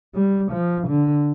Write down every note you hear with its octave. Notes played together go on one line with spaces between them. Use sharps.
G3
F3
D3